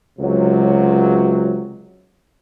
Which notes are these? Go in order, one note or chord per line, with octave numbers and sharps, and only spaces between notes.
C#2 C3 F#3